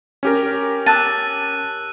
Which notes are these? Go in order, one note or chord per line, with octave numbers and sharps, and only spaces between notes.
C#4 G4 A#4
A5 E6 F#6 D#7